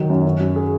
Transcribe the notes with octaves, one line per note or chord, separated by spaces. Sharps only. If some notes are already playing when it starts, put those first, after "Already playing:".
Already playing: D#3 F#3
F#2
C#4
F#3
G#4